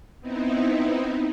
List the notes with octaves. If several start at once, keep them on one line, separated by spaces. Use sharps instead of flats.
B3 C4 D#4 E4